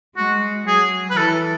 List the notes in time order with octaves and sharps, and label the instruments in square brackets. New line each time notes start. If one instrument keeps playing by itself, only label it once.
[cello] G#3 [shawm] F#4
[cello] F#3 [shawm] G#4
[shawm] B4
[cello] E3 [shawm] A4